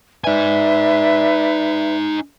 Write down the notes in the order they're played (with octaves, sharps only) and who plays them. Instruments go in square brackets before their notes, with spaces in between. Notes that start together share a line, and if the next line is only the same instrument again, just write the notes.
[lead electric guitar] D#4 G#5 [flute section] B4 D5 E5